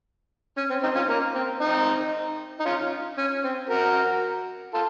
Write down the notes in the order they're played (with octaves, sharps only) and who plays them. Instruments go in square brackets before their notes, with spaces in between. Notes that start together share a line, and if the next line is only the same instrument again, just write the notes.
[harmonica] C#4
C4
C4 D#4
C#4 F4
A#3
C4
C4 D#4
D#4
C#4 F4
C#4
C4
F#4 A#4
F4 A4